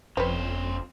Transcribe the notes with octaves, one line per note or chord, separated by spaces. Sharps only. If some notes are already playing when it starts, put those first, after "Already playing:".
F#1 F2 C4 C#4 B4 C5